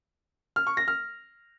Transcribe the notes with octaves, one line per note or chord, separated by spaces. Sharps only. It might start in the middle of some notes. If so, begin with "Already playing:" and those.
F6
C#6
A#6
F6